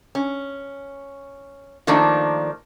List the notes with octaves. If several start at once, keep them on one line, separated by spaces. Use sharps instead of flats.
C#4
D#3 F3 A3 A#3 D4 D#4